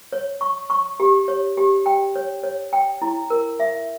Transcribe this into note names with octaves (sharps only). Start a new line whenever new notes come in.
C#5
C#6
C#6
G4
C#5
G4
G5
C#5
C#5
G5
E4
A#4
E5